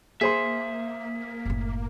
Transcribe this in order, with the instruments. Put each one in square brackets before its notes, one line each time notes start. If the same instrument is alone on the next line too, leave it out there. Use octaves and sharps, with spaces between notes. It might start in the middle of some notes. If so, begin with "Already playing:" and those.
[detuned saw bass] A#3 [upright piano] G#4 C5 C6 [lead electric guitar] E5
[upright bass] F#1 A2